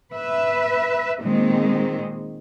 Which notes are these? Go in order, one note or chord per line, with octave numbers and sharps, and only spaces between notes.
B4 E5
A#2 D#3 G#3 C4